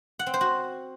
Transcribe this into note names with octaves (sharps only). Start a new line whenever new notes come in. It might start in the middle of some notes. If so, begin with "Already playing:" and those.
F#5
C4
C5
F#4